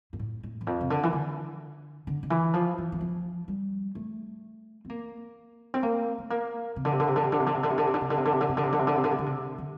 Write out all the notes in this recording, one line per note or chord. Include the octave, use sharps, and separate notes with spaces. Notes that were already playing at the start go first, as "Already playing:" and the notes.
G2
A2
A2
E2
F2
C3
D3
E3
D3
D3
D3
E3
F3
E3
E3
F3
G3
A3
C4
A#3
C4
A#3
A3
A#3
C3
D3
C3
D3
C3
D3
C3
D3
C3
D3
C3
D3
C3
D3
C3
D3
C3
D3
C3
D3
C3
D3
C3
D3
C3
D3
C3
D3
C3
D3
C3
D3
C3
D3